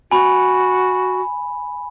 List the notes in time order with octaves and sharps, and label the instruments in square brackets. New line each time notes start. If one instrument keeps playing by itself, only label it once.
[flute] F#4 [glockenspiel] G#5 B5